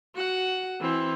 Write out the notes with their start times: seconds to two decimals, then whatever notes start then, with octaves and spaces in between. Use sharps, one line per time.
0.15 F#4 F#5
0.81 E3 C4